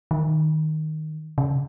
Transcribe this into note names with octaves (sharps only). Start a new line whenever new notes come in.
D#3
C#3